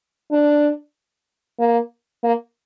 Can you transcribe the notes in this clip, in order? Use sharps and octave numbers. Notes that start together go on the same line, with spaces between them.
D4
A#3
A#3